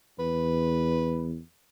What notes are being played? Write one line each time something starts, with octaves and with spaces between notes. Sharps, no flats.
E2 B4